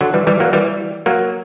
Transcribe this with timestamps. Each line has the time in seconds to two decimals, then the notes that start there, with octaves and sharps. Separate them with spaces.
0.01 D3 F#3
0.14 E3 G3
0.27 E3 G3
0.40 F#3 A#3
0.53 E3 G3
1.06 F#3 A#3